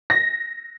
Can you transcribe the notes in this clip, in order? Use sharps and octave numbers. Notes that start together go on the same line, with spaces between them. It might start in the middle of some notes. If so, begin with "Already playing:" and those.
A#6